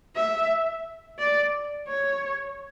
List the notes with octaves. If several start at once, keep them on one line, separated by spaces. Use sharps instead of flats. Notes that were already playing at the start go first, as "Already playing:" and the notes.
E5
D5
C#5